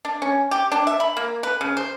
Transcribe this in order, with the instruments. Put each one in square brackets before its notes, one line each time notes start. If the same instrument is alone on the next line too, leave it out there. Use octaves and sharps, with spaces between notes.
[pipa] D4
C#4
G4
D4
E5
B5
A#3
B4
C#3
C5